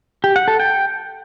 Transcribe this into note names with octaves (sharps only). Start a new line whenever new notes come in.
G4
F#5
A4
G5